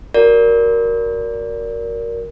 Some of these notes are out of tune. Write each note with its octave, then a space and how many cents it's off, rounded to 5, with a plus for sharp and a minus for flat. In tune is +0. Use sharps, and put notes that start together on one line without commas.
F#4 +0 A#4 +0 D5 -25